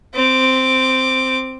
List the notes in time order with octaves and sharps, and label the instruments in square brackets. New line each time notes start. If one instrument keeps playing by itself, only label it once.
[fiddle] C4 D6